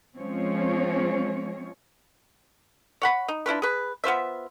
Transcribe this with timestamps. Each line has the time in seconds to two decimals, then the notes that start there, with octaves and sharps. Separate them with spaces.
0.16 F3 G#3 C4 C#4 C#5
3.02 C#5 F#5 B5
3.28 D#4
3.46 D4 E4 F4 B4
3.62 G#4 B4
4.04 B3 F4 C5 E5